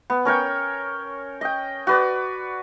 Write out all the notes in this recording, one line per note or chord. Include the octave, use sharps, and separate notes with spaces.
B3
C#4 A#4 C#5 G5
D#5 G5
F#4 B4 D5